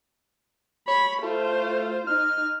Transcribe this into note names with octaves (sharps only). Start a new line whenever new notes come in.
C#5 B5
A3 F4 C5
D#4 F6